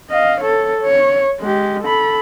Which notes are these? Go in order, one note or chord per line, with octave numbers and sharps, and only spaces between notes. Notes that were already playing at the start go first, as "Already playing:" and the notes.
D#5 F5
A4 C#5
C#5
G#3 G4
A4 B5